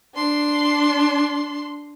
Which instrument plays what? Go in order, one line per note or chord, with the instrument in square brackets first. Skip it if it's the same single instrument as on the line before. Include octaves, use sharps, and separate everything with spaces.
[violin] D4 C6